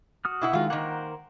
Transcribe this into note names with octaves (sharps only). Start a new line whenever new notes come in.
F#4 D#6 F6
B2 E4 F#5
D#3 G#3 F4 F#4
D#3 A#3 A#4 C5 F#5